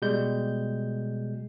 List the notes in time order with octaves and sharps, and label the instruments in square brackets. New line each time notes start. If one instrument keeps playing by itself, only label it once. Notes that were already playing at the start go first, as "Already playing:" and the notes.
[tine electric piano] B2 G3 G#3 G6